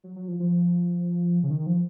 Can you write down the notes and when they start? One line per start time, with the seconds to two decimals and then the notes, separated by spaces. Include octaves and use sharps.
0.04 F#3
0.16 F#3
0.28 F3
0.40 F3
1.43 C#3
1.50 D#3
1.66 F3